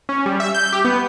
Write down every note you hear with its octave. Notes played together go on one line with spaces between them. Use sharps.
C#4
G3
E5
G6
G4
B3